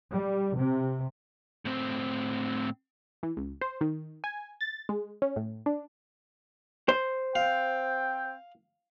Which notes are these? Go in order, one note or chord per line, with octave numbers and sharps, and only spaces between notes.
G3
C3
A2 C4
E3
C#2
C5
D#3
G#5
A6
G#3
C#4
A2
D4
C5
C4 F5 G5